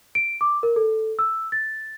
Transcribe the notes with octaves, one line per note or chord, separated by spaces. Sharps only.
D7
D6
A#4
A4
E6
A6